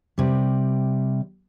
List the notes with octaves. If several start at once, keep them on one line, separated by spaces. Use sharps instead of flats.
C3 G3